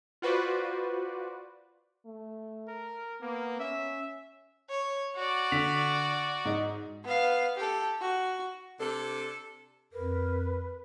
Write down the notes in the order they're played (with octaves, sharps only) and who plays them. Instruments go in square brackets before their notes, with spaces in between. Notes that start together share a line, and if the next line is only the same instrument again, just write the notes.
[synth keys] F4 F#4 B4 C5 D5
[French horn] A3
[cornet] A#4
[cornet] A#3 [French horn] B3
[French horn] C#4 [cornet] E5
[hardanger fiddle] C#5
F#4 D5
[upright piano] D3 B6 F7
G#2 D#4
[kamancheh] B3 F5
G4 A4
F#4
[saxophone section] C3 D4 A4
[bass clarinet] F2 [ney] A#4 [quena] B4